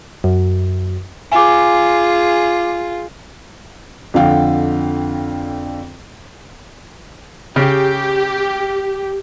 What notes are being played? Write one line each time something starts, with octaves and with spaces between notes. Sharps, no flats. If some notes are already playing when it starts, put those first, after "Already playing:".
F#2
F4 G#4 G#5 D6
F2 D3 F5 G5
C#3 G4